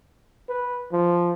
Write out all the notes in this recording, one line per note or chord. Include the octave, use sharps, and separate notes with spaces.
B4
F3